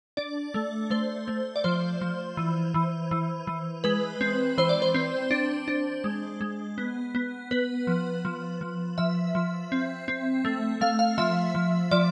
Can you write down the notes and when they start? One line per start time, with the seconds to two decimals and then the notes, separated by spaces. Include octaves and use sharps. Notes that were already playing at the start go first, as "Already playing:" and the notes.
0.17 D4 D5
0.54 A3
0.90 A3 C5
1.28 A3
1.56 D5
1.64 F3 C5
2.01 F3
2.37 E3
2.74 E3
3.11 E3
3.47 E3
3.84 G#3 B4
4.21 C4
4.58 E3 C5
4.69 D5
4.82 C5
4.94 C4
5.31 D4
5.68 D4
6.04 G#3
6.41 G#3
6.78 B3
7.15 B3
7.51 B3 B4
7.87 F3
8.25 F3
8.61 F3
8.98 F3 E5
9.35 F3
9.72 C4
10.08 C4
10.45 A3
10.81 A3 F5
10.99 F5
11.18 F3 E5
11.55 F3
11.91 F3 D5